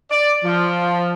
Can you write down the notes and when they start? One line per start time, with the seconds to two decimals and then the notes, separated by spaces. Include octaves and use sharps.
0.11 D5
0.45 F3